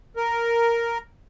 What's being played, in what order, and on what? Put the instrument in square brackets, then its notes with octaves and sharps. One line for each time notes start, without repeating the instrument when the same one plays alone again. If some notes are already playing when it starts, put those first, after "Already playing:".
[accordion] A#4